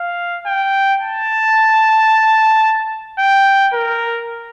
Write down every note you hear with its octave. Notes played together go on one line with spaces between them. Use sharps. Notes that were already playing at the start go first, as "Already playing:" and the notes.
Already playing: F5
G5
A5
G5
A#4